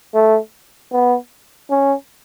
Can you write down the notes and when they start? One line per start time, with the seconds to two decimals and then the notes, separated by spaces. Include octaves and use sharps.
0.14 A3
0.92 B3
1.70 C#4